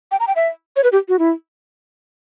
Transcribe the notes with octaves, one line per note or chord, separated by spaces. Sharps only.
G5
A#5
G5
E5
C#5
B4
G4
F#4
E4